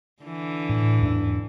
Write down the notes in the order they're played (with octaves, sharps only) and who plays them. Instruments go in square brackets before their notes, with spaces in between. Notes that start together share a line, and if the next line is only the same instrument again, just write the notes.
[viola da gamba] D3 E3
[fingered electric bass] A2
E2 G#2 D4